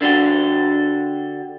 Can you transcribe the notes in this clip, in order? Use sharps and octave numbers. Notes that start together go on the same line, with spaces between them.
D3 D4 F#4 G4